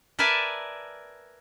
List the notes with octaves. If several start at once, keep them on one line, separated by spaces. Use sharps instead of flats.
A#4 B4 D5 E5 G#5 A5